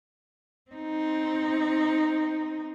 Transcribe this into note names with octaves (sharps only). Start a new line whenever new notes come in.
C4 D#4